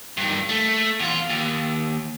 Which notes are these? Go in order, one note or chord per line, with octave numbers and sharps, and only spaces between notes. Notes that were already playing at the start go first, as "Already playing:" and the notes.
G2 D#3
A3
E2 F4
D#2